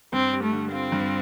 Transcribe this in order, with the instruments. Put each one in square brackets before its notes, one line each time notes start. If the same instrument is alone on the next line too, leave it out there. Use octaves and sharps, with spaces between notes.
[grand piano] G2 [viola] C4
[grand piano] G3
[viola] A3
[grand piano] D3
[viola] C4 [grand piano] F4
[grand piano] G2